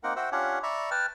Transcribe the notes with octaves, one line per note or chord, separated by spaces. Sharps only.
A#3 C4 D#4 A#4 F#5
F#4 C5 E5 F#5 G5
C#4 D4 F4 G4 C#5 F#5
D5 E5 A#5 B5 C#6
B4 G5 A5 F6